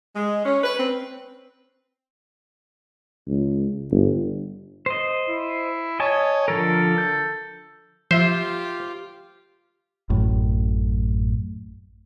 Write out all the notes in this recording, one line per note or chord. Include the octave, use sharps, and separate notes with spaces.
G#3
C#4
B4
C4
C#2
G1
C5 D#5
E4
C#5 D#5 G#5 A5
D3 F3 A4 A#4
G6
F3 F4 G4 C5 E5
A1 F#2 A2